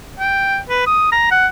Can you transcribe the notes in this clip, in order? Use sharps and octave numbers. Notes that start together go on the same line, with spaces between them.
G5
B4
D#6
A#5
F#5